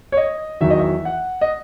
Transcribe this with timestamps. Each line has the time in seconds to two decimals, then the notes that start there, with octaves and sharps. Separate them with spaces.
0.12 C#5
0.17 D#5
0.61 E2 D#3 F#3 E5
0.70 D#5
0.79 E5
1.05 F#5
1.41 D#5